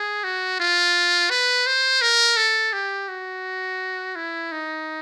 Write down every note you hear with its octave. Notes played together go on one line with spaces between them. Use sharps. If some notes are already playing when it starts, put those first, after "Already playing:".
Already playing: G#4
F#4
F4
B4
C5
A#4
A4
G4
F#4
E4
D#4